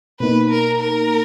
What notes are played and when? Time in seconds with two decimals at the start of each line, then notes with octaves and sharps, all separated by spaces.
0.20 B2 A#3 D#4 B4
0.50 A#4
0.80 A#4